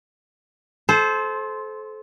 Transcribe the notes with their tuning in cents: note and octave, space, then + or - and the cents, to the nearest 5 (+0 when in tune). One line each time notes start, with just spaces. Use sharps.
A4 -30 C5 +0